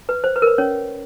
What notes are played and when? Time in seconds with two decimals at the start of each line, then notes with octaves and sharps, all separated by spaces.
0.09 B4
0.24 C5
0.36 B4
0.42 A#4
0.47 B4
0.58 C#4 C#5